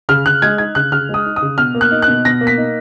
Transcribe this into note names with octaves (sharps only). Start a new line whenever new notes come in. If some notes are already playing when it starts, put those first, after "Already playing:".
C#3 F6
C#3 F#6
G#3 G#6
D#4 G#6
C#3 F#6
C#3 F6
G#3 D#6
D#4
D#6
C#3
B2 F6
A#3
F#6
D#4
F#6
B2
B2 A#6
A#3
B6
D#4